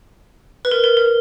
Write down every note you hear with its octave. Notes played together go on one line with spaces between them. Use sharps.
B4
A#4
A#4
A#4